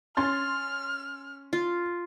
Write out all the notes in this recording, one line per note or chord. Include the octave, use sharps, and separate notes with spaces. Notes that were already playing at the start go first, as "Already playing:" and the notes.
C#4 C6 F6 A6
F4